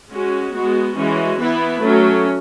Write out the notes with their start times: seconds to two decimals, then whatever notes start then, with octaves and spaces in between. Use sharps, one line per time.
0.11 G#3 C#4 F#4
0.54 G#3 B3 F#4
0.96 E3 G#3 C#4 F#4
1.38 E3 B3 E4 B4
1.81 F#3 A3 C#4